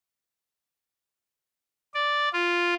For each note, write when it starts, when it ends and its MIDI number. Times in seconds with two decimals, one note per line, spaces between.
1.94 2.29 74
2.33 2.74 65